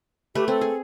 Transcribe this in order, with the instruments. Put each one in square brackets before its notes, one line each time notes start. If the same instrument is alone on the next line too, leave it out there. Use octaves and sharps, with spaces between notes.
[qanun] A3 B4 [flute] G4
[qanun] C4 [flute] A4
[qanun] G#4